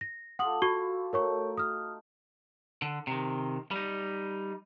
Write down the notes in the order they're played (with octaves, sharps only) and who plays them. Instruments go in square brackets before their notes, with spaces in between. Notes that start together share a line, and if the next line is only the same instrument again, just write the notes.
[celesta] A#6
[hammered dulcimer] F4 G4 A4 [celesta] F#5 D#6 F#7
[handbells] F#4 [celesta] C#6
[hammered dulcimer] A3 D#4 G5 [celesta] A#4 C#5 C#6
[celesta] D#6 F6
[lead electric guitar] D3
C3 D#3
G3 D#4